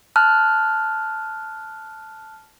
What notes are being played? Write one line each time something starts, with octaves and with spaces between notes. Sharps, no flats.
A5 F6 F#6